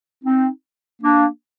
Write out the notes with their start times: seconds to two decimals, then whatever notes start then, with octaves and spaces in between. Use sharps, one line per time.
0.24 C4 D#4
1.02 A#3 D4